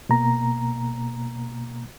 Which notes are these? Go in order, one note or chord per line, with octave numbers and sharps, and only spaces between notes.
B2 A#3 A#5